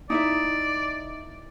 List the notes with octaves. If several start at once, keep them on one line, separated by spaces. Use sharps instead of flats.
D#4 E4 D5 E5